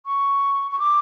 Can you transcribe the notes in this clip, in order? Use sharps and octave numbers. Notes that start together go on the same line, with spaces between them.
C#6
C#6
D6